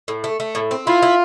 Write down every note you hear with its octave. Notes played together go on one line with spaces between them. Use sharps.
A2
A3
A3
A2
C4
E4 F4
E4